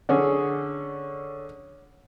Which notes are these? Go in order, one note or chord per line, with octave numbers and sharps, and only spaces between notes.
D3 C#4 G#4